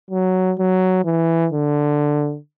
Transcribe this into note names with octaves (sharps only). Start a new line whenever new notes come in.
F#3
F#3
E3
D3